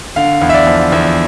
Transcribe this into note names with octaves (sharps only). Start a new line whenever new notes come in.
D3 F5
E2
E5
D5
F3
E2